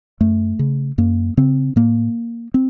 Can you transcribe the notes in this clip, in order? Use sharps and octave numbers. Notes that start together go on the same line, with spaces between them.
F#2 A3
C#3
F#2 A#3
C#3 C4
A2 A#3
C4